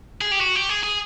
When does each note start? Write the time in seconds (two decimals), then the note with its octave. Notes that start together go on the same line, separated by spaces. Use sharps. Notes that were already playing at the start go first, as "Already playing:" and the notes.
0.21 G#4
0.32 G4
0.40 F#4
0.55 G4
0.69 G#4
0.83 G#4